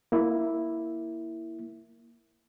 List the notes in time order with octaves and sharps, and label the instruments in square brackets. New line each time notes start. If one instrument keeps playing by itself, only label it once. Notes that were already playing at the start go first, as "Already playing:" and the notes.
[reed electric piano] A#3 E4